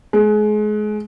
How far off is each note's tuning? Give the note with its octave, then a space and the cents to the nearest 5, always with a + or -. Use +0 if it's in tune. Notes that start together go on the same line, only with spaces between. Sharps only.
G#3 +30